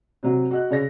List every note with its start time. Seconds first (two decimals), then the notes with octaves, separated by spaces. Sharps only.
0.23 C3 F#3
0.51 F#4 D#5 F#6
0.70 C#3 C#5 A#6